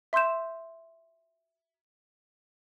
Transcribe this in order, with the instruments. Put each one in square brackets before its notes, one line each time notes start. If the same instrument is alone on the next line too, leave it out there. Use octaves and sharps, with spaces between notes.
[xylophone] E5 C6 E6 G6 E7